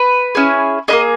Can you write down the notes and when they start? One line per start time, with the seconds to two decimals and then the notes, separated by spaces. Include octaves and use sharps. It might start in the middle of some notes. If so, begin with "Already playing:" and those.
Already playing: B4
0.35 C#4 E4 G#4
0.88 A#3 E4 G#4 D#5